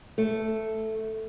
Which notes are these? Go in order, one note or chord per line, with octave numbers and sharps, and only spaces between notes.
A3